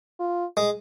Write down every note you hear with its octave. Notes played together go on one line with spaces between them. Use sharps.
F4
G#3